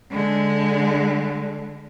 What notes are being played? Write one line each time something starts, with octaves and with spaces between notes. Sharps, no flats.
D3 G#3